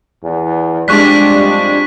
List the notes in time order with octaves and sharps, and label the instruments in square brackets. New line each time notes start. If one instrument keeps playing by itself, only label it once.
[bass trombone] E2
[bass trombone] F2 [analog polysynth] G3 G#3 D4 [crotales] C#6 F#6 B6